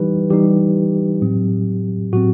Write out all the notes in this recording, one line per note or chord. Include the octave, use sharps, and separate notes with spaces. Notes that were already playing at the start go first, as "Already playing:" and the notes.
Already playing: E3 G3 D#4 G4 B4
E3 G3 D#4 G4
A2 F#3 C4
A2 F#3 C4 F#4